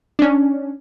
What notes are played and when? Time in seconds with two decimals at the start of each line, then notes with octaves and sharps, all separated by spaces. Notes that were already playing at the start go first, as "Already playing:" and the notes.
0.19 C#4 D4